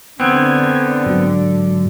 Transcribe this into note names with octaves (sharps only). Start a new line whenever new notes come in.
D3 B3 C4 G#6
G#2 F#3